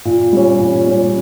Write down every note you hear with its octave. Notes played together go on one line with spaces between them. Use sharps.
A#2
G3 C#4
A#2
G3 C#4